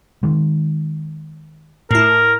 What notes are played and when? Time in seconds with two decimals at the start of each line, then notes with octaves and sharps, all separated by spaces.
0.23 D#3 G#3
1.91 A2 E4 A#4